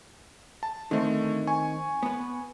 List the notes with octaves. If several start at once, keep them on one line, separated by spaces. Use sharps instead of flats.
A5
D3 D#3 A3 C4
G#5 C#6
B3 B4